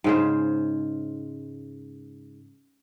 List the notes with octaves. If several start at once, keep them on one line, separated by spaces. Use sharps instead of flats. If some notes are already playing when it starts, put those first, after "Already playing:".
G#2 C#3 C5